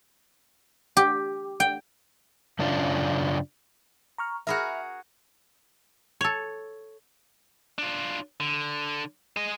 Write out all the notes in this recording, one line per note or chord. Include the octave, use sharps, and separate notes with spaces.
G4
G5
F#2 C#3 C#4 D4 F4
A#5 C#6 F6
F#4 G#4 A#4 E5 B5 F6
A4 C#5
D4 F4
D3
G#4 D#5